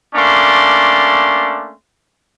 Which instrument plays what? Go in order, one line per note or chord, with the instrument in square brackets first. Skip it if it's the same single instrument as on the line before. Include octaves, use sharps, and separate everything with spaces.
[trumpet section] A3 A#3 C#4 D4 C6